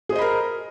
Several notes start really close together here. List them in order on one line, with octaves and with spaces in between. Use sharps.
G#4 C5 D#5 B5 A#4